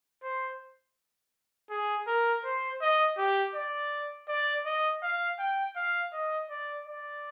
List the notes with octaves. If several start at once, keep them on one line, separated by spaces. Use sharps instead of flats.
C5
G#4
A#4
C5
D#5
G4
D5
D5
D#5
F5
G5
F5
D#5
D5
D5